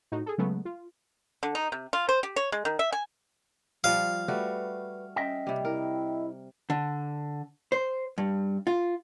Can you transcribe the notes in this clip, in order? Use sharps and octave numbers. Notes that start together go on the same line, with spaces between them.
A2 D#4 F#4
G#4 A4
C#3 F#3 G#3 A3 B3
F4
D3
D#4
C3
F4
C5
G4
C#5
G#3
D#3
E5
G#5
F3 G3 F5
G3 A3 F#4 B4
C#4 D#5 E5 G5
C3 G3
E4 A#4
D3
C5
G2
F4